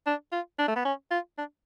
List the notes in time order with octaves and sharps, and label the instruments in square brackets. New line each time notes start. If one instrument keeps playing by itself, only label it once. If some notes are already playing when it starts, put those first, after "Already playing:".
[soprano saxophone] D4
F4
D4
A3
B3
C#4
F4
D4